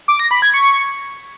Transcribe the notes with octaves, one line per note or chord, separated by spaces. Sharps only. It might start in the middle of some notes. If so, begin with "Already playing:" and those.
D6
A#6
B5
G#6
C#6